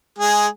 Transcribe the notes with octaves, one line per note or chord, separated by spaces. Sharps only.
G#3 G#4